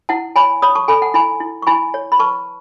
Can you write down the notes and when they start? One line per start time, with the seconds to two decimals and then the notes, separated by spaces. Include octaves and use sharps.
0.09 E4 F#5 A5
0.36 C#5 G#5 B5
0.62 C#5 B5 D#6
0.75 A5 C#6
0.88 A4 G#5 B5
1.02 F#5 A5
1.14 E4 G#5 B5
1.40 E4
1.62 C#6
1.67 E4 G#5 B5
1.94 C#5
2.12 B5
2.20 B4 A5 C#6